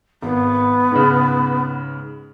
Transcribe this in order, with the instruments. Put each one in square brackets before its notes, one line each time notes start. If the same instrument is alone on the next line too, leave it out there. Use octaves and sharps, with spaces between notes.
[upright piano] G#1 [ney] B3
[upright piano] G#2 C#3